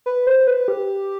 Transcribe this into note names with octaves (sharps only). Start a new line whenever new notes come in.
B4
C5
B4
G4